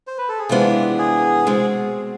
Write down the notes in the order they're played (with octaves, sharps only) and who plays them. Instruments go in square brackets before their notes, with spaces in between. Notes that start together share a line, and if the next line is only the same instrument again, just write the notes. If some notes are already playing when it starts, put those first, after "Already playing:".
[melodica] C5
B4
A4
G#4
[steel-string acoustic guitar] C3 E3 G#3 B3 D4 [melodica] F4
[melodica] G#4
[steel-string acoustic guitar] B2 G#3 C4